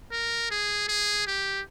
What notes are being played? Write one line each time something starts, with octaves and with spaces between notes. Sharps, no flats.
A#4
G#4
G#4
G4